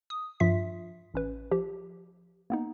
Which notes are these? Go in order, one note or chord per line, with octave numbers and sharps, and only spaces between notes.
D#6
G2 F3 F4 E5 B6
A1 C#4 B4
F3 G4
A#3 B3 D#4